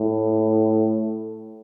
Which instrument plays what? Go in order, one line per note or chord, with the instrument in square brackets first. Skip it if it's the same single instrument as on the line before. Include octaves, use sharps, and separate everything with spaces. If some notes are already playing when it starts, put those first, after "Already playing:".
Already playing: [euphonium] A2